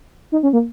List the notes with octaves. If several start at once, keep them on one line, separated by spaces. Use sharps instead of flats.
D#4
C#4
A#3